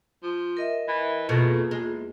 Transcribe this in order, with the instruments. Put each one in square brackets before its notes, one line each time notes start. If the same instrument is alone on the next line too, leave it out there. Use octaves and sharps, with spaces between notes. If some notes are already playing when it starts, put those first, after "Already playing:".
[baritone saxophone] F3
[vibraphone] A#4 D#5 E5
[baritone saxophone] E3
[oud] F2 B2 [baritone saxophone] A3 [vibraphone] A#3 F4 G#4
[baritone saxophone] E2 [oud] G#3